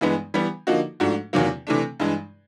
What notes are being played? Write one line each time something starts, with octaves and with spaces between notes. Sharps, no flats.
G2 E3 G#3 B3
E3 G3 B3
D3 F3 A#3 D#4 F#4
G#2 F3 A3 D4 F#4
E2 C3 D#3 F#3 A#3
C3 E3 A3 D4
G2 E3 G#3